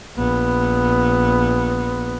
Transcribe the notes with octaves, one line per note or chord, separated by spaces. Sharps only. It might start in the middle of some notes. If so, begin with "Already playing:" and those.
A#1 B3